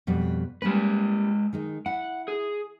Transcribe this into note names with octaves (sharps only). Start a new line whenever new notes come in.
F2 B2 G3
G3 G#3 A#3 C#4 B4
D#3 G#3 D#4
E4 F#5
G#4